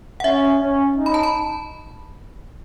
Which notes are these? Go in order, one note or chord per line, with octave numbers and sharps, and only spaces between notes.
F#5
C#4 E5
C#4
D#4
B5
A5
B5